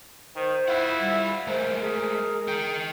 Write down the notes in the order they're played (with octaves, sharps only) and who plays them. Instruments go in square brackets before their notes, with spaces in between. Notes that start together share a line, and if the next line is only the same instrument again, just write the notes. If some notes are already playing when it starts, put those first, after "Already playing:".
[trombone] D#3 [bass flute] C5
[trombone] E4 [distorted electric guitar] F4 F#5
[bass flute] G3
[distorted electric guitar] G#3 A3 [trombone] A#4 [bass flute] C5
[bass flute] G#4
[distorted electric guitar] D#4 G5